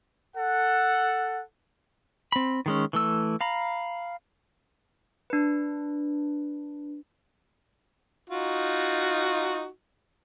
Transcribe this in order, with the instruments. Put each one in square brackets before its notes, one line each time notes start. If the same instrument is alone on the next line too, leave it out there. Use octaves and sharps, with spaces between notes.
[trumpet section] A4 F#5
[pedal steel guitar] C4 B5
D#3 G#3 C#4
E3 A3 E6
F5 A#5 B5
[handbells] D4 B4
[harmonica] D#4 F4 F#4